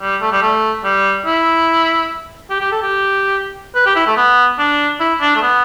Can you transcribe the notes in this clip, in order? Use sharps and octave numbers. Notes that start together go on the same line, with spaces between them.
G3
A3
G3
A3
G3
E4
G4
G4
A4
G4
B4
G4
E4
A3
B3
D4
E4
D4
A3
B3